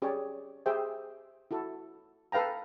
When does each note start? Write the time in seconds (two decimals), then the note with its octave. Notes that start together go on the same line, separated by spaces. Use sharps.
0.02 C#4 G4 G#4 C#5 D5
0.66 G4 G#4 C5 E5 G5
1.51 E4 F#4 A4
2.32 A4 B4 F5 G5 A#5